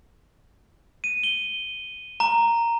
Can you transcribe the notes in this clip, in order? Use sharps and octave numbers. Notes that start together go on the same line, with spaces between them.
D#7
G7
A#5